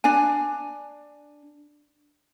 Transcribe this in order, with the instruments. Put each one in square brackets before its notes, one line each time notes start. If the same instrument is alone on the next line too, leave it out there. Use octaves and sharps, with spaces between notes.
[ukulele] D4 G#5